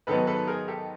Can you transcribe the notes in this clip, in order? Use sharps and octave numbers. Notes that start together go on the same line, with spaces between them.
G#2 D#3 F#3 B3 A4 B4
A4 B4
G#4 A#4
G4 A4